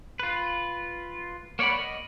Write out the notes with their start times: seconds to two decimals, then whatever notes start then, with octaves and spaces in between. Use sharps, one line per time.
0.20 F4 B4
1.59 A#3 C#5 D5 F#5 B5
1.78 D#5